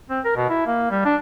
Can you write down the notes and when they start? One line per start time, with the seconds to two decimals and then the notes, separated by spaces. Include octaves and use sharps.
0.10 C4
0.25 A#4
0.36 B2
0.50 E4
0.67 A#3
0.91 G3
1.06 D4